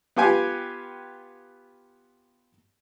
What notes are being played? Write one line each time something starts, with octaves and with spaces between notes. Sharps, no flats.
B3 F4 G4 G5 G#5